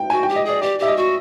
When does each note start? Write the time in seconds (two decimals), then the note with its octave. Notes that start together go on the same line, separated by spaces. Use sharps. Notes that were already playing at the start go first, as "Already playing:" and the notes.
Already playing: G5
0.10 F#4 G#5
0.23 G5
0.28 G4
0.36 D#5
0.45 G#4 D5
0.62 G4 D5
0.79 G4 E5
0.88 D#5
0.96 F#4